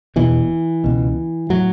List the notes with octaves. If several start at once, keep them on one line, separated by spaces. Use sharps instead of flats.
E1 E2 B2 E3
C#2 B2
A2 F#3